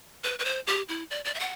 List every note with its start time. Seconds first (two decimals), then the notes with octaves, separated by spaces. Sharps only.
0.24 B4
0.39 B4
0.45 C5
0.67 G4
0.89 E4
1.11 D5
1.25 D5
1.34 E5
1.40 F#5